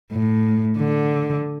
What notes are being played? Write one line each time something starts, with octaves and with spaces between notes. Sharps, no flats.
A2
D3